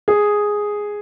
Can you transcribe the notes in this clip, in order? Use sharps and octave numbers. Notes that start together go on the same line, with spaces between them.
G#4